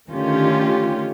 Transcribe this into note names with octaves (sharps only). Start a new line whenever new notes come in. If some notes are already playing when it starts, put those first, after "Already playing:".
D3 D#3 A3 C#4 F4 G4